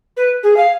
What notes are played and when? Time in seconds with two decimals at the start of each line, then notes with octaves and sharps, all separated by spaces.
0.16 B4
0.43 G#4
0.56 F5